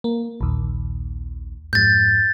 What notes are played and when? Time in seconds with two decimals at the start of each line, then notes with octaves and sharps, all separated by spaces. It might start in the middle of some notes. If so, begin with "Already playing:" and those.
0.04 A#3
0.41 A#1 D#2
1.73 F2 G#2 G6 A6